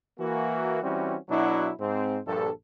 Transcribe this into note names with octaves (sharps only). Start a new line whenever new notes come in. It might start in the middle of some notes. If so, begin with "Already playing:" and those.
E3 A#3 F#4
E3 G3 C4 C#4 E4 F#4
B2 F#3 D4 E4
G#2 C4
A#1 G2 A4